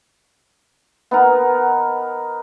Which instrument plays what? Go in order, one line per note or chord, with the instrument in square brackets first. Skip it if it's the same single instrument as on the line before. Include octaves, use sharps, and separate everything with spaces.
[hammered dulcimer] B3 D#4 A#4